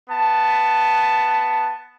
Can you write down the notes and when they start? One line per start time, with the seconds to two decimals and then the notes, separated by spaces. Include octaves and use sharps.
0.10 B3 A5